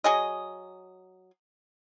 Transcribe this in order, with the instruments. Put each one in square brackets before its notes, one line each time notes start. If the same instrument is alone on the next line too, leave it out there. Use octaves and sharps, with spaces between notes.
[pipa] F#3 G#4 D#5